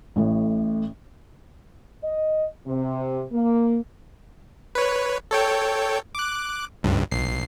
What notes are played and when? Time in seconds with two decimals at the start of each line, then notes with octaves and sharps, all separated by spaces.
0.16 A1 A2
2.03 D#5
2.66 C3
3.31 A#3
4.75 B4 C#5
5.31 A4 C#5 G5
6.15 D6 F#6
6.83 C#2 G2
7.11 B1 C7